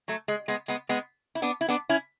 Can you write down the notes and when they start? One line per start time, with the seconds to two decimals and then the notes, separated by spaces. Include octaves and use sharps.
0.08 F#3 A3
0.28 G#3
0.48 G#3 B3
0.68 G#3 B3
0.89 G#3 B3
1.35 E4
1.42 B3 D4
1.61 E4
1.68 B3 D4
1.89 C#4 E4